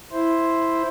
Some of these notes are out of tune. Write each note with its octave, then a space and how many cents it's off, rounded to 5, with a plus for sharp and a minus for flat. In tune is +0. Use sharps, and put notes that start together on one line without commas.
E4 +0 C5 +0